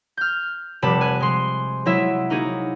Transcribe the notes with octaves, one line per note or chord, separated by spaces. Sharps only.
F6 G6
F1 C3 G3 A5 B5
G#5 F#6
G#3 C6
F#3 G#3 E4 E5
A#3 D#4 F#4 G#4